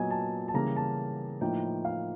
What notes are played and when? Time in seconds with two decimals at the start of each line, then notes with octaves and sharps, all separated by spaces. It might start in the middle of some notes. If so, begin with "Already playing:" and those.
Already playing: A#2 F#3 B3 D4 D#5 G#5
0.11 A5
0.48 A5
0.54 C#3 E3 G3 A#3 A#5
0.76 A5
1.41 A2 F3 A#3 D#4 G5
1.85 F5